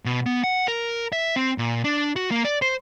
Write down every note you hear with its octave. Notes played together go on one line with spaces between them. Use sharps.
B2
B3
F#5
A#4
E5
C4
A#2
D4
F#4
A#3
D5
C5